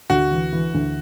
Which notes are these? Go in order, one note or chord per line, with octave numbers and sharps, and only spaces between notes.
D2 F#4
E3
E3
D2